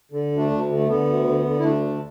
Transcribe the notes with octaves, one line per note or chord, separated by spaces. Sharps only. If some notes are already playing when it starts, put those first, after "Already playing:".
D3
D2
A3 D4
D2
D3
A3
D3 B3
D2
D3
D3
E4
D2 A3 D4
D3